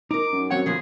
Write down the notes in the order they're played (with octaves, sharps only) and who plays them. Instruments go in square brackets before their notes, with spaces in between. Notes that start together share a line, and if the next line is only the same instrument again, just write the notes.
[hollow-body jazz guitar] D#4 A#4 [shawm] D6
[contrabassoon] F#2
[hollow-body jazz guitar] F#3 C4 F#5 [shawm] C#5
[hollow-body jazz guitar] D3 F3 B3 [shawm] G#4